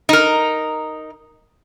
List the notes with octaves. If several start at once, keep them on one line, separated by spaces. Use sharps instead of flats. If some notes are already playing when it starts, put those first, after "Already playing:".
D#4 A#4